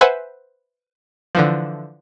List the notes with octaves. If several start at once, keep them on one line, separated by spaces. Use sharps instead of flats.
B4 C5 E5 F#5 G#5
D3 E3 F3